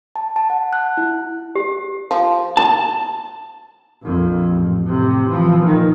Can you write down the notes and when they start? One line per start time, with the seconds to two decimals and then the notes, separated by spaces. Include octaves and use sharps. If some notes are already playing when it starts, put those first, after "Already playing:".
0.16 A5
0.36 A5
0.50 F#5
0.73 F#6
0.97 E4
1.55 G4
2.11 F3
2.57 A5
4.02 A#1 F2
4.51 A1
4.85 A2 C3
5.28 E3 F3
5.61 A#2 D#3